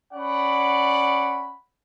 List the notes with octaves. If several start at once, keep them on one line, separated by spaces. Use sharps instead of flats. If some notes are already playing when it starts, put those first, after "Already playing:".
C#4 D5 F#5 B5